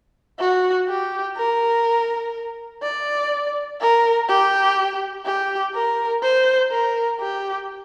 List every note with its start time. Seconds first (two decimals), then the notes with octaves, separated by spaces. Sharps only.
0.40 F#4
0.89 G4
1.37 A#4
2.83 D5
3.80 A#4
4.29 G4
5.26 G4
5.74 A#4
6.23 C5
6.72 A#4
7.20 G4